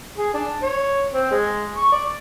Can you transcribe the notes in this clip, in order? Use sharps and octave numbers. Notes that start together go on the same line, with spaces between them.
G#4
D4
C#5
C4
G#3
C#6
D5